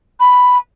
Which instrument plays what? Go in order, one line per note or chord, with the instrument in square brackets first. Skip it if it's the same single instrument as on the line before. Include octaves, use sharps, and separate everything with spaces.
[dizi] B5